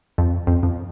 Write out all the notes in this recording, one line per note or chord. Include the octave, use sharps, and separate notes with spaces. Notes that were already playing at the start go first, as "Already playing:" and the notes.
F2
F2
F2